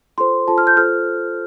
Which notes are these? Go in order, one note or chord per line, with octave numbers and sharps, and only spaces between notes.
F4 A4 C5 C6
F4 A4 C5 A5
F6
G6
F4 A4 C5 F6